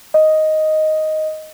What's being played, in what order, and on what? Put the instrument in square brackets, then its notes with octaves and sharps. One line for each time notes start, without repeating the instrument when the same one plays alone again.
[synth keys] D#5